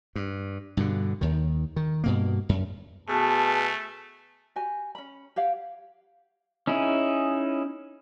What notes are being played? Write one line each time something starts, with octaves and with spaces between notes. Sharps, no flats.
G2
G2 B2 D3
D#2 D#3
D#3
G2 B2 A#3
F#2
B2 A3 G#4 A5
F#4 G4 G#5
C#4 B5
G4 C#5 F5 F#5
C#4 D#4 E4 G#4